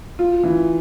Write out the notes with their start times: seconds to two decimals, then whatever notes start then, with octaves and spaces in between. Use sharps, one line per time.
0.19 F4
0.43 E3